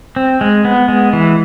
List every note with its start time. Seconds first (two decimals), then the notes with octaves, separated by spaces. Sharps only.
0.16 C4
0.41 G#3
0.65 B3
0.88 G#3
1.13 E3